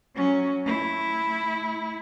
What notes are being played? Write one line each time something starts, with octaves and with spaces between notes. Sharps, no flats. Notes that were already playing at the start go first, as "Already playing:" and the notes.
F#3 C#4
A3 E4